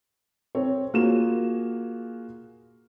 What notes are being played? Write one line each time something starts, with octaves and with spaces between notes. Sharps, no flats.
C4 C#5
A#3 F4 F#4 G#4 E7